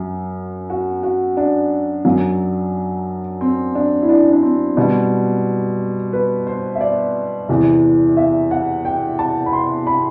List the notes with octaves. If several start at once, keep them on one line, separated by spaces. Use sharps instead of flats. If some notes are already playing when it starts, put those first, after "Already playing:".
Already playing: F#2 F#3
F#4
F#4
D4
F#2 F#3
C4
D4
E4
D4
D4
C4
B2 G3
B4
C5
E5
D5
E2 C3 E3
E5
F#5
G5
A5
B5
C6
B5